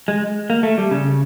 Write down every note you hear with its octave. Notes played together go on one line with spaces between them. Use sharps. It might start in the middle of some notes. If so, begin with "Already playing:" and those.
G#3
A#3
A3
G3
C#3